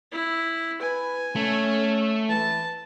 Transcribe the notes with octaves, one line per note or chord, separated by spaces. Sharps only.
E4
B4 G#5
A3 C#4
E3 A5